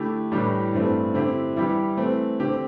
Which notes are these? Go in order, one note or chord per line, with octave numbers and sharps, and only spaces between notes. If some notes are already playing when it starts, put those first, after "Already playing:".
Already playing: D3 A3 E4 G4
A2 E3 G3 D4 G4
G2 E3 A3 C4
D3 C4 E4 G4
E3 G3 E4 G4
E3 A3 C4
D3 C4 G4